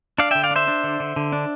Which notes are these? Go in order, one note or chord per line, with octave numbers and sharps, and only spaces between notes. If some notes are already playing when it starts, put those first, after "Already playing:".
D4 D5 F5
D3 E5 G5
D5 F5
D4 C5 E5
D4
D3
D3
D3
D4